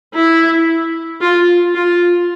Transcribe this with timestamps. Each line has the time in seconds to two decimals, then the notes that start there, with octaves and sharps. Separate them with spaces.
0.14 E4
1.21 F4
1.75 F4